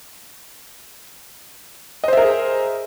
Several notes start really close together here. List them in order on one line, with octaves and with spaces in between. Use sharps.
D#5 C5 E5 A#4 G#4